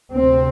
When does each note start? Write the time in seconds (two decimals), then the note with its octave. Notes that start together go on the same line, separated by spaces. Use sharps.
0.14 D2 C3 C4